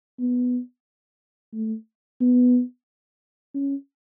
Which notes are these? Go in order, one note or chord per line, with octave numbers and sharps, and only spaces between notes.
B3
A3
B3
C#4